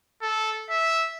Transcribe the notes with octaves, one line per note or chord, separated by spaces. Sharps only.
A4
E5